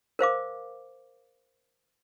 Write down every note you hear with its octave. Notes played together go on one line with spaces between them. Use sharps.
A#4 C5 F5 D6